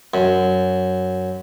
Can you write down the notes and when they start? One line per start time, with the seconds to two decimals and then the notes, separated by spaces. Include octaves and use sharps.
0.14 F#2